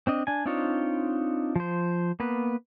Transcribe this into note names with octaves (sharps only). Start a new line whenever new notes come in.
C4 D4 D#5
D4 G#5
C4 D4 D#4 F4 C#5
F3 C5
A#3 B3 B4